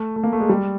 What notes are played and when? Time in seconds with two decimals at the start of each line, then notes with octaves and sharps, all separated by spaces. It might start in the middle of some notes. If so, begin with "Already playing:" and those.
Already playing: A3
0.16 A3
0.24 A#3
0.33 A3
0.40 G#3
0.49 G3